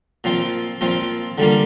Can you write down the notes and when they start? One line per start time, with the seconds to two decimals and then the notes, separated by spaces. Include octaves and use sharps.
0.24 A#2 F3 C4 F4
0.81 A#2 F3 C4 F4
1.38 D3 G3 A#3 F4